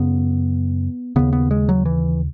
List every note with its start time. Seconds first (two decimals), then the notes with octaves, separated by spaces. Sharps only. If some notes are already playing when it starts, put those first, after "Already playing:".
Already playing: F#2 C#3 B3
1.16 D#2 C#3 B3
1.33 B3
1.51 G#3
1.69 F#3
1.85 E3